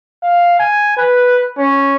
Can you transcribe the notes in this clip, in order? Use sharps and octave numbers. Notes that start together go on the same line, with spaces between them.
F5
G#5
B4
C#4